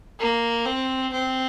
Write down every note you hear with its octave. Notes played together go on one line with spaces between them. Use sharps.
A#3
C4
C4